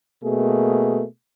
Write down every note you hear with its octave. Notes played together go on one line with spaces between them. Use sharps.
B2 A3 A#3 G#4